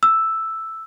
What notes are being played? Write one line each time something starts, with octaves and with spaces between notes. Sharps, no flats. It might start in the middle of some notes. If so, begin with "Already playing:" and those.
E6